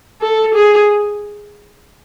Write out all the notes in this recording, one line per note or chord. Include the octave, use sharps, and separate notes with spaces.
A4
G#4